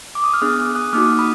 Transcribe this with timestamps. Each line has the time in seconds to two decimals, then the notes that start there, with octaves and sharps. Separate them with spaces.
0.15 D6
0.24 D#6
0.34 F6
0.41 B3 D4 G#4 D#6 F#6
0.75 D#6 F#6
0.93 A#3 D#4 F#4 D6 F6
1.19 B5 D#6